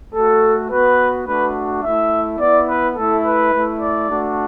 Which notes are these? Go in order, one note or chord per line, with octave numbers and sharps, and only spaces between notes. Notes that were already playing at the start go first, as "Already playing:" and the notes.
A3 F#4 A4
B3 F#4 B4
A3 D4 F#4 B4
A3 E4 E5
B3 E4 D5
B4
A3 E4 A4
B4
A3 E4
D5
A3 D4 F#4